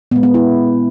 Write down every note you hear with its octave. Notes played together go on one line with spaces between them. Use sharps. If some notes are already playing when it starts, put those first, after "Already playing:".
A#2 G#3 B3
B3
E4